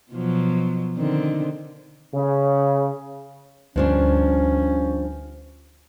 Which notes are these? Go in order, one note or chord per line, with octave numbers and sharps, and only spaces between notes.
B2 F3 F#3
D3 D#3 C4
C#3
D2 G2 F3 C#4 D4